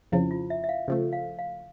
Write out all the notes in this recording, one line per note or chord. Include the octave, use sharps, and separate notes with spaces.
F2 C#3 F3 E4
F4
E5
E5
F5
C#3 F3 A3
F5
F5